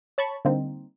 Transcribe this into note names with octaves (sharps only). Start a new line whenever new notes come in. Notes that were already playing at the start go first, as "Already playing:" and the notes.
C#5 A5 B5 C#6
D3 G3 A#3 C4 D#4